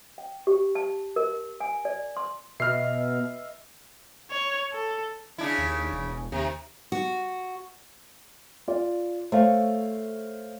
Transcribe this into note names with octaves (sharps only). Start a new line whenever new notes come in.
G5
G4
A5
A#4
G#5
D5
C6
B2 B4 D#5 E5 F6 C7
C#5
A4
C#3 D4 E4
D#2
E1
D#2 C3
F#4
F4 D5
A3 C5 C#5 F5